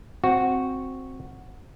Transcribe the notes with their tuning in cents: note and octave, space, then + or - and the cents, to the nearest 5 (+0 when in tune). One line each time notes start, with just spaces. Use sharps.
C4 +5 F#4 -5